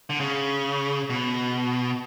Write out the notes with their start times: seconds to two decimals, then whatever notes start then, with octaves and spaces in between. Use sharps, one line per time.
0.10 D3
0.20 C#3
1.10 B2